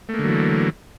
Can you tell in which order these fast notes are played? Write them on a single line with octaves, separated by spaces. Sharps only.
A3 A#3 D3 F#3 E3